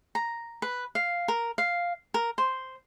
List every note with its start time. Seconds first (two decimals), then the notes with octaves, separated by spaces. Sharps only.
0.15 A#5
0.62 B4
0.95 F5
1.28 A#4
1.58 F5
2.14 A#4
2.38 C5